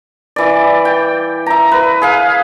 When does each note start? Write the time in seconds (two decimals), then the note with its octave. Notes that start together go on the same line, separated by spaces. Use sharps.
0.36 E3 D5
0.85 G5
1.46 E5 A#5
1.72 B4
2.02 G#4 F5